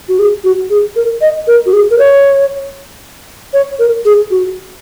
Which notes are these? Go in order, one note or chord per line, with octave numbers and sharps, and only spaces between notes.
F#4
G#4
F#4
G#4
A#4
D#5
A#4
F#4
G#4
A#4
C#5
C#5
A#4
G#4
F#4